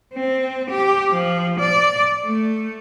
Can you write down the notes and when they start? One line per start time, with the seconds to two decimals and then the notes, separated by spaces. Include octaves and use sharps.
0.14 C4
0.70 G4
1.12 F3
1.59 D5
2.25 A3